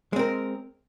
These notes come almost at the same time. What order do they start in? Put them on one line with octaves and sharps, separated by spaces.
G#3 C4 A#4